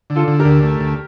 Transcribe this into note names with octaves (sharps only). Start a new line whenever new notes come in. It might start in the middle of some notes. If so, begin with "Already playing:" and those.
D3
F4 A4
D3
G4 A#4
D2
A3
D2